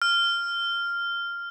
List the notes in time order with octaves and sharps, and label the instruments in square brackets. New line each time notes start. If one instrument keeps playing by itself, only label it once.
[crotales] F6